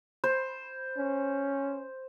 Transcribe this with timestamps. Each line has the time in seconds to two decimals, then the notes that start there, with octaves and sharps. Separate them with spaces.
0.24 C5
0.97 C#4